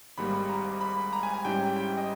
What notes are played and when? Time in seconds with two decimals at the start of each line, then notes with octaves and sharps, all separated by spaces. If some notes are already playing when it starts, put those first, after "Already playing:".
0.17 G#1 G#2 G3 A#3 B5
0.49 A#5
0.81 B5
1.13 A#5
1.23 G#5
1.34 G#5
1.45 G#2 G3 C#4 E4 G5
1.77 G5
1.98 D#5